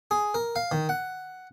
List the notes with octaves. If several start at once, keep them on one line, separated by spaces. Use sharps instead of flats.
G#4
A#4
F5
D#3
F#5